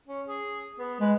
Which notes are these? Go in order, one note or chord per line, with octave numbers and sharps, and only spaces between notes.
C#4
G#4
B3
G#3 B4